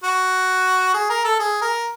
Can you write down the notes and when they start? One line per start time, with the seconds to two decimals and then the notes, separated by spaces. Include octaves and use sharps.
0.04 F#4
0.94 G#4
1.10 A#4
1.24 A4
1.39 G#4
1.61 A#4